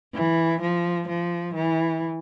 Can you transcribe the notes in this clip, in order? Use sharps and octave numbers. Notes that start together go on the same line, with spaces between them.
E3
F3
F3
E3